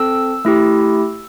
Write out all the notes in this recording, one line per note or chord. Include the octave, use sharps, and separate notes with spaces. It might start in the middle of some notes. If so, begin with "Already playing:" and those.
Already playing: C4 A4 E6
A3 E4 G4